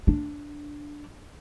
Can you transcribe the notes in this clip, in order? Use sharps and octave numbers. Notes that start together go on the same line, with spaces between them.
D4